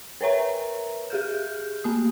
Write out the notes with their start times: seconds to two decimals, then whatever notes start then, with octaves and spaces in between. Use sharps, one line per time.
0.21 A#4 B4 C#5 E5 A#5
1.10 G4 G#4 F6 G6
1.84 A3 A#3 D#6